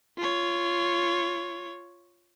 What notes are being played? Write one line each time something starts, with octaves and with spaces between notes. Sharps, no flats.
F4 C#5